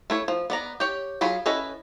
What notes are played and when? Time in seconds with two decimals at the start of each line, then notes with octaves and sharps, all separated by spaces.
0.10 A3 E4 C#5
0.28 F3
0.50 B3 D5 A#5
0.80 G4 C#5
1.21 F#3 F4 G#4 B5
1.46 C#4 E4 A4 B4 D#5